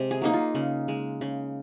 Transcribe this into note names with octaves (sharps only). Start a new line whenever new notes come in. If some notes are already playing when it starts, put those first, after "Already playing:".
Already playing: C3 G#3
G#4
F#3 A#3 D#4
F4
C#3
G#3
C#3